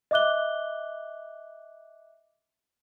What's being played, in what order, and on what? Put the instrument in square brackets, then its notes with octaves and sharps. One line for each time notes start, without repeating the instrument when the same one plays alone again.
[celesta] D#5 E5 D6 F#6 G7